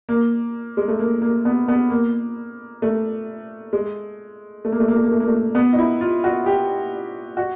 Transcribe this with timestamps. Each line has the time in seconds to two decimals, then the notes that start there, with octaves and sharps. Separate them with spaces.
0.09 A#3
0.77 G#3
0.88 A3
0.99 A#3
1.22 A#3
1.45 B3
1.68 B3
1.90 A#3
2.82 A3
3.73 G#3
4.65 A3
4.72 A#3
4.80 A3
4.88 A#3
4.97 A3
5.04 A#3
5.12 A3
5.20 A#3
5.27 A3
5.55 B3
5.73 D#4
5.78 E4
6.01 F4
6.24 F#4
6.46 G4
7.37 F#4